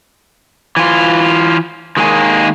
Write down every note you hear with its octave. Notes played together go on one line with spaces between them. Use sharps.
E3 F4
D#3 G#3 A#3 G#4